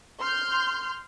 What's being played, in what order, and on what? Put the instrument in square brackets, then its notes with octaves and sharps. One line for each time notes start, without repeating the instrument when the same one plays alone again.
[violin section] C6 F6 G6